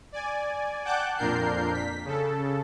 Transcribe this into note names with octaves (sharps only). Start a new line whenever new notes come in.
D5 G#5
F#5 G5 A5 D6 F#6 G6
F2 A#2 D4 A#4 G6 C7
B6
C#3 A4